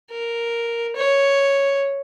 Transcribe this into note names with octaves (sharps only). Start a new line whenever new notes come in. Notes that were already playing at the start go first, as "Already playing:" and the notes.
A#4
C#5